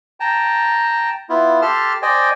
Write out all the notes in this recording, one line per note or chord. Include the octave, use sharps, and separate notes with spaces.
G5 A5 A#5
B3 E4 F4
G4 A4 A5 C6 F6
C5 D5 D#5 G5 G#5